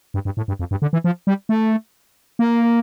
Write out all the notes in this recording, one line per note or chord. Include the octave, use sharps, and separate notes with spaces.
G2
G2
A2
G2
F2
G2
D3
E3
F3
G3
A3
A#3